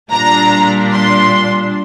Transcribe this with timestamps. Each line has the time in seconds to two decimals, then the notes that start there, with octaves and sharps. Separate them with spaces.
0.12 A#2 G3 D4 A#5
0.93 C6